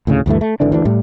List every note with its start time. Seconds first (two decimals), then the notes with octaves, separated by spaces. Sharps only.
0.07 D2 A2 C#3
0.26 D2 G2 E3 A3
0.41 A3
0.60 G#1 D3 E3 D4
0.72 D2 E3 D4
0.85 A2 G3